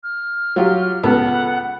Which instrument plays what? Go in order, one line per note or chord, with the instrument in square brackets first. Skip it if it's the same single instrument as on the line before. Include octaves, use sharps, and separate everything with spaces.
[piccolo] F6
[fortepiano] F#3 F4 G4
[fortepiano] C#2 B3 A4 [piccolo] F#5